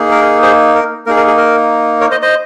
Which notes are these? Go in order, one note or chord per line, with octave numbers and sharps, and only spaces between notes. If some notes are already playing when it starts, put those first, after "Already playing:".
Already playing: A#3 D#4 G#4
A#4
G#4 C5
A#4
A#3 D#4 G#4 A#4
A#4
G#4
A#4
A#4 C#5
C5 D#5
C5 D#5